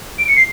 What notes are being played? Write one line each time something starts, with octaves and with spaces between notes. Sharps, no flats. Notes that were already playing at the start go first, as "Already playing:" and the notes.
D7
C#7
C7